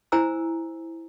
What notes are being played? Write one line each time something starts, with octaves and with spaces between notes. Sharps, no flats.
E4 C5 G#5 A#5 E6